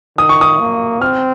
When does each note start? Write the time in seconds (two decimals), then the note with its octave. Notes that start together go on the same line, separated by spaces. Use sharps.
0.18 D#3 D#6
0.29 C#6
0.41 D#6
0.60 A#3
1.01 C4 F6